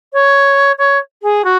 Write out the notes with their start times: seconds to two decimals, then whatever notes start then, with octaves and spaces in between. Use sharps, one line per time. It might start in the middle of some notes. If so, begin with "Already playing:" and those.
0.13 C#5
0.78 C#5
1.22 G#4
1.44 F#4